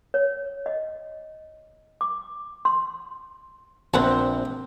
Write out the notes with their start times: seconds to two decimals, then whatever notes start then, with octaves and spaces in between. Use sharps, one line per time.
0.14 C#5
0.66 D#5
2.01 D6
2.65 C6
3.94 A#1 C4 B4 F#5 A5